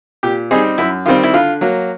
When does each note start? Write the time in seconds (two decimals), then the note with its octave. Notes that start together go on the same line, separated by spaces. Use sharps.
0.23 A#2 G4
0.51 G3 C4 D#4 G#4
0.78 F#2 E4
1.06 D#3 G3 C4 F4
1.24 E4
1.34 D3 F4
1.61 F#3 A#3